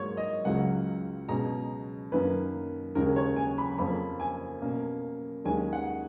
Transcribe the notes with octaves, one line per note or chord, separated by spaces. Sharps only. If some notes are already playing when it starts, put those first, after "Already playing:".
Already playing: G#2 F#3 A#3 C#5
D#5
C#2 C#3 F#3 F#5
B2 G#3 C#4 A#5
F#2 D#3 A#3 C#4 B4
D#2 C#3 G#3 C#4 A#4
C#5
G#5
B5
F2 F3 A#3 C#4 B5
G#5
B2 A#3 C#4
D#2 D#3 G#3 C#4 G#5
F#5